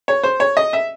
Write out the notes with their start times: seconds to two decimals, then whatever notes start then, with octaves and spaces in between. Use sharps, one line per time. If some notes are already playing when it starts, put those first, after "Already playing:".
0.08 C#5
0.24 C5
0.40 C#5
0.57 D#5
0.73 E5